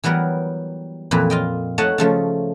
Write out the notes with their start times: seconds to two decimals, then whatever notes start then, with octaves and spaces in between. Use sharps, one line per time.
0.04 E3 F#3 G3 B3 A#4
1.11 F2 A#2 E3 B4 B5
1.30 F4 D#5 G5
1.78 A3 D#4 C#5 D#5 F#5 A5
1.98 C#3 F3 A3